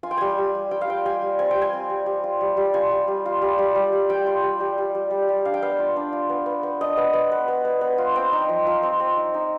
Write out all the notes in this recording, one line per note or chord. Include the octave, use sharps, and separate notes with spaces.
F4 G#5
G5
G3 G#5
G3
G3
G3 G5
F5
F4 G5
G3 G#5
G3
C4 G#5
G3 G5
G#5
C4
G3
G3
F4
G3
G3
F4 G#5
G3
G3
F4
G3
G3
G3
G3
G3 G5
F4
G3
G3
G3
G3
G3
G3
D4 F5
G5
B3 F5
F4
D4
F4
B3
B3
B3
D4 D#5
B3
B3
B3
B3
B3
B3
F4
C4 G5
D#4
F3
F3
C4
C4
D#4
D#4